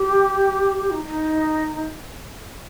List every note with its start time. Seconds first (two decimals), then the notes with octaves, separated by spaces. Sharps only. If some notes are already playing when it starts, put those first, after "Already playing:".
Already playing: G4
0.90 D#4
1.04 D#4